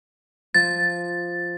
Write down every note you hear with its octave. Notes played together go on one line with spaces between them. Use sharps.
F3 A6